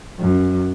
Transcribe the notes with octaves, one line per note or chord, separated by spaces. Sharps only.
F#2